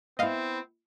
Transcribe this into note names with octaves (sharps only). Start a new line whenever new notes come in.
B3 C4 E4 D#5 F5